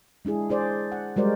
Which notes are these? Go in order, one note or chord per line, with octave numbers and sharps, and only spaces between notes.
G#3 D4 E4 G#4
D4 G#4 C5 D5
F#5
G3 G#3 F#4 A#4 C5 D5